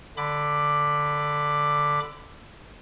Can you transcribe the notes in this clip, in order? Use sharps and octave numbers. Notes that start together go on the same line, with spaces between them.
D3 B5 D6